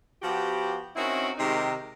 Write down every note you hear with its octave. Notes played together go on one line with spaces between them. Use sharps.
F3 B3 F#4 G4
C4 C#4 D#4 E4 F#4 A#4
C3 D#3 G#3 D#4 G4 A#4